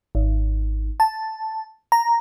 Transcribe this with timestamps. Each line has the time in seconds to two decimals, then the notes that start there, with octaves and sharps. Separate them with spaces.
0.15 G#1
1.00 A5
1.92 A#5